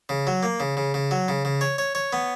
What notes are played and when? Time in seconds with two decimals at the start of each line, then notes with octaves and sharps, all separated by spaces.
0.09 C#3
0.27 F#3
0.43 A#3
0.60 C#3
0.77 C#3
0.94 C#3
1.11 F#3
1.28 C#3
1.45 C#3
1.61 C#5
1.78 C#5
1.95 C#5
2.13 B3